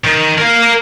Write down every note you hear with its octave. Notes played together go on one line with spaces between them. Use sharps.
D#3
A#4 F5